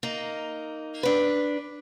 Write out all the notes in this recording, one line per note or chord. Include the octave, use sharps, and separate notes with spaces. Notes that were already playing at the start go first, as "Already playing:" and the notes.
A#3 D#4
D4 B4